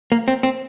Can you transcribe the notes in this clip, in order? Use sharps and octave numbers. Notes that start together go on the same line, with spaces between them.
A#3
C4
C4